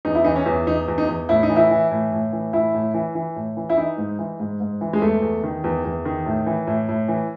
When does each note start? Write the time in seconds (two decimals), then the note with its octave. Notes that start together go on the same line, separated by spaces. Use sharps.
0.05 E2 D#4
0.15 E4
0.24 E3 D#4
0.36 C#4
0.46 E2
0.67 E2 D#4
0.88 E2
0.98 D#4
1.08 E2
1.29 A2 E4
1.43 D#4
1.50 E3
1.56 E4
1.71 E3
1.91 A2
2.12 A2
2.33 E3
2.53 A2 E4
2.74 A2
2.94 E3
3.15 E3
3.36 A2
3.57 E3
3.70 E4
3.78 E3 D#4
3.98 G#2
4.19 E3
4.40 G#2
4.61 G#2
4.81 E3
4.93 G#3
5.02 E2 A3
5.22 E2
5.43 D#3
5.64 E2
5.85 E2
6.05 D#3
6.26 A2
6.46 E3
6.67 A2
6.89 A2
7.08 E3